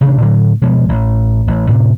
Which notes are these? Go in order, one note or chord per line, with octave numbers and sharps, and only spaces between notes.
A1 C3 D#3 D4
A2 D3 F#3
B2 F3 G#3
A1
A1
A2 C3